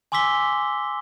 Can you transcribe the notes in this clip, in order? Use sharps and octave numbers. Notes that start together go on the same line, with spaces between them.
G#5 C6 D6 E6 B6 G7